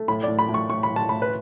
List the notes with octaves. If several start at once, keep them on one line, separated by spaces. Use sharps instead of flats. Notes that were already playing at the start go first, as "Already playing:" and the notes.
Already playing: A3
A2 B5
D5
A2
B5
A2
C#6
A2 C#6
B5
A2
A5
A2 B5
B4